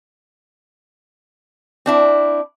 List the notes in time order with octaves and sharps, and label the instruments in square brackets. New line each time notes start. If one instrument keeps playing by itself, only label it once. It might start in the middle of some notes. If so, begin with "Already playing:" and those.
[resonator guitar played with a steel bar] C4 D4 E4